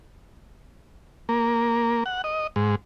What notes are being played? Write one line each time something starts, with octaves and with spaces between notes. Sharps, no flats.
A#3
F#5
D#5
G#2